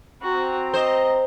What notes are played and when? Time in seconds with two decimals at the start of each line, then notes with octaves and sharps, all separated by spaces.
0.22 C4 F#4 A#5
0.74 C5 D#5